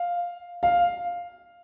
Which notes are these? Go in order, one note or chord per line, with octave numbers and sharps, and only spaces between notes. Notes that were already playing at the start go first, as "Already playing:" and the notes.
Already playing: F5
F5